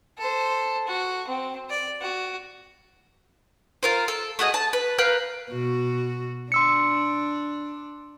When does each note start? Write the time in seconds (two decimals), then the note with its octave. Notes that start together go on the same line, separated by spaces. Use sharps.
0.18 A4 C5
0.87 F#4
1.28 C4
1.70 D5
2.01 F#4
3.83 F4 A#4 C5
4.08 A4
4.39 A3 F#4 G#4 D#5
4.54 A5
4.73 B4
4.98 A#4 B4 F5 G6
5.51 B2 F#4
6.52 D4 C6 E6 C#7